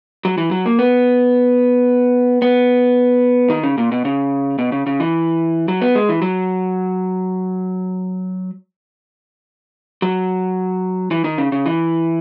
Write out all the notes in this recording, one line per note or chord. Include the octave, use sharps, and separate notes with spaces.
F#3
E3
F#3
A#3
B3
B3
D#3
C#3
A#2
B2
C#3
B2
C#3
C#3
E3
F#3
B3
G#3
E3
F#3
F#3
E3
D#3
C#3
C#3
E3